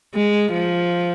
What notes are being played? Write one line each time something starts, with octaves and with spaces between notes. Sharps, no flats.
G#3
F3